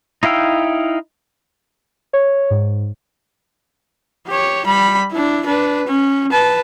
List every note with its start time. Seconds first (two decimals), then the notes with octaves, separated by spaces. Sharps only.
0.23 D#4 E4 F5 G5 E6
2.13 C#5
2.50 G#2
4.27 G4 C#5
4.66 G3 B5
5.11 D4 E4
5.46 D4 B4
5.87 C#4
6.31 B4 A5